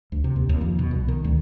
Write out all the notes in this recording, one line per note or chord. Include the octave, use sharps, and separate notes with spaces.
D2
C3
D#2
D#2
F2
B2
C2
D#3
D2